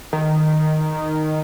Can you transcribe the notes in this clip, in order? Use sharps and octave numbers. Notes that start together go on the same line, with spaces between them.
D#3